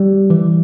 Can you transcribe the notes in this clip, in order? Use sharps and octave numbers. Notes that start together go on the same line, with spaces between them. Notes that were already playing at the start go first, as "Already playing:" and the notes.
Already playing: G3
E3